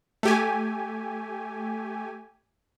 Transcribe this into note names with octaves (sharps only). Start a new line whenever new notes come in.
A3 G4 G#5